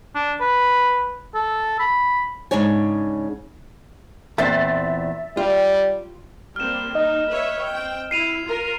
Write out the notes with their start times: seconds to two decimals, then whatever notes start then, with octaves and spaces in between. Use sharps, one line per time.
0.15 D4
0.41 B4
1.35 A4
1.80 B5
2.51 G#2 C#3 D4 C#5 G#5
4.38 E2 A#2 C4 E5 A6
5.37 G3 F4
6.56 G3 A#3 C4 F6 E7
6.95 D#4 D#5
7.29 B4 C#5 E5
7.68 C4 G5
8.11 E4 C7 D#7 F7
8.46 F4 A#4